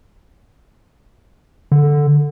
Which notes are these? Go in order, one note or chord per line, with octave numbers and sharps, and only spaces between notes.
D3